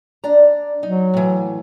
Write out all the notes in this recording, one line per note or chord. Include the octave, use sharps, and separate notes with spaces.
D4 D5 A#5
F#3 D#4
A2 E3